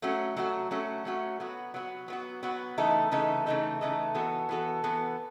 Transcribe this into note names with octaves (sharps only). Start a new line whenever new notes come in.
F#3 A3 C#4 F#4
F#3 A3 C#4 F#4
F#3 A3 C#4 F#4
F#3 A3 C#4 F#4
F#3 B3 F#4
F#3 B3 F#4
F#3 B3 F#4
F#3 B3 F#4
C#3 E3 A3 D#4 A4
C#3 E3 A3 D#4 A4
C#3 E3 A3 D#4 A4
C#3 E3 A3 D#4 A4
E3 B3 F#4 A4
E3 B3 F#4 A4
E3 B3 F#4 A4